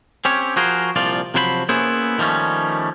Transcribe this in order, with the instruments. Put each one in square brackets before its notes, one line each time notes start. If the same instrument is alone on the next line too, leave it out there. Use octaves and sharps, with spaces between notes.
[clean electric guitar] C4 C#4 G4 C#5
F3 F#4 G#4 A#4 C5
C2 A#2 F3 F4 D5
C3 F3 F#3 C5 G5 B5
A#3 B3 C#4 E4 G#4 C5
D#3 F3 G3 A3 C#4